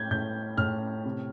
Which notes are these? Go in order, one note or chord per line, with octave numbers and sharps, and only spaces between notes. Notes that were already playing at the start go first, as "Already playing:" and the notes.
Already playing: A2 G6 G#6
A2 G6
A2 F6
C3